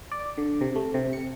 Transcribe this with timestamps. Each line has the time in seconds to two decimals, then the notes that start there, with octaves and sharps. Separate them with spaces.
0.11 D5
0.38 D3
0.61 C3
0.76 A3
0.94 C3
1.13 C#7